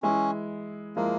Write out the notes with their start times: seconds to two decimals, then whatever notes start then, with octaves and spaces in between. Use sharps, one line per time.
0.03 E3 G#3 C#4 E4
0.96 F3 G#3 A#3 E4 A#4